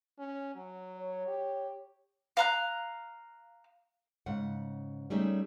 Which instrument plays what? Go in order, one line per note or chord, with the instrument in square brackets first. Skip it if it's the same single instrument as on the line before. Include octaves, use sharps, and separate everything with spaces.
[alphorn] C#4
F#3
[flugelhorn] C#5
[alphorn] G4
[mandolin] F5 A#5 F#6
[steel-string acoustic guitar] G#2 C#3 F#5
G3 A3 C#4 D#4 G#4 E5